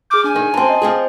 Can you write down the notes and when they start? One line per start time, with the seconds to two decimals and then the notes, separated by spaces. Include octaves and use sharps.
0.10 G#4 D6 F6 G6
0.24 D4 G#5
0.36 D#3
0.54 F#2 C4 A5 C6
0.69 D#5
0.82 F3 C4 G#4